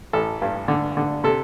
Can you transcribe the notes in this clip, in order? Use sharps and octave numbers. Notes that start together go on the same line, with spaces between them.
A1 A4
G2
D3
D3
C3 A4